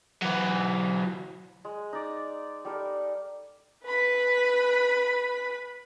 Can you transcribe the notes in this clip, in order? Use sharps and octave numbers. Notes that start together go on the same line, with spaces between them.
E3 F#3
G#3
D#4 D5
G3 A4 A#4
B4 B5